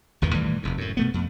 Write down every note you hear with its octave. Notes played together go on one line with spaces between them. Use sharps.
G#1 E2 D#3 E3
A2 D#3 E3 G3
F1 E2
F#2 A2
B2 A3 B3
F2